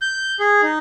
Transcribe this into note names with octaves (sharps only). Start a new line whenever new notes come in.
G6
G#4
D#4